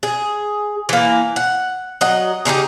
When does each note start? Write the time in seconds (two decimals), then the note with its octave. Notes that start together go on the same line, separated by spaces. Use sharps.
0.03 G#4
0.89 E3 A#3
1.36 F#5
2.01 F#3 D#5 F#5
2.45 C#3 D#4 E4 G4